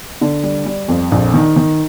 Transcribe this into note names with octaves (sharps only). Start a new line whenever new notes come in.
D3
G3
G3
F2
A#1
D#3
D#3